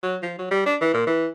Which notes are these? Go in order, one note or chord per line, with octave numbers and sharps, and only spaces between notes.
F#3
F3
F#3
G3
D4
E3
A#2
E3